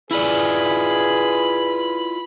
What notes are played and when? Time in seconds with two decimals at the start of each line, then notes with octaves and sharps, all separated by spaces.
0.11 E4 F4 G#4 B4 D5 B5